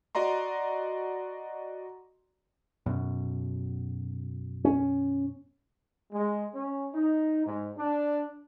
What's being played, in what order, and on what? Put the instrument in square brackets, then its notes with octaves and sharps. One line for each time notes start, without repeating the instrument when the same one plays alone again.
[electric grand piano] F#4 D5 D#5 A#5 C6
[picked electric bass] F#2 B2
[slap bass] C#4
[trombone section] G#3
C#4
D#4
G#2
D4